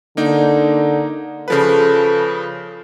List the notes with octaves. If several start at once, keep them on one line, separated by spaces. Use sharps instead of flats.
D3 A#3 D#4
C#3 F3 A4 B4